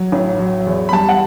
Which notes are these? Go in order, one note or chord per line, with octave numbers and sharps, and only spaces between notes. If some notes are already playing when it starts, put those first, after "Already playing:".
Already playing: F#3
A1
F#3
E2
B5
G3 A5
F#5